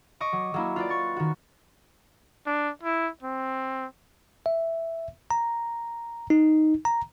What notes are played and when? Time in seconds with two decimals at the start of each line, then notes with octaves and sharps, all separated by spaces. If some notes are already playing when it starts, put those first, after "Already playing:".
0.20 D#5 C#6 D6
0.33 F#3
0.54 F#3 A#3 E4
0.76 F4 B4 D5
0.89 C#6 A6
1.16 D#3 F#4
2.46 D4
2.83 E4
3.23 C4
4.46 E5
5.31 A#5
6.30 D#4
6.85 A#5